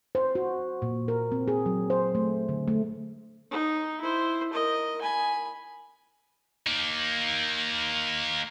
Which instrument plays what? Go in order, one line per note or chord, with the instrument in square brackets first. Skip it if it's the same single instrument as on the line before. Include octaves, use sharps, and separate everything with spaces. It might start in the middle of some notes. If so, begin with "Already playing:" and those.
[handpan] C5
F#4
A#2
A#4
C4
G#4
F#3
C5
A3
D3
A3
[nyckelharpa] D#4
E4 C5
A#4 D#5
G#5 B5
[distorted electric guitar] A#3 D#4